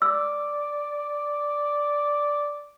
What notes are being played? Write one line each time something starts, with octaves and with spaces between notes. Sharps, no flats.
D5 E6